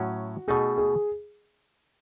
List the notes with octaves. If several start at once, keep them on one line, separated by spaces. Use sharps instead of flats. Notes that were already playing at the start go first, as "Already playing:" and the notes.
Already playing: A2 F#3 C#4 F#4
B2 A3 D#4 G#4
G#4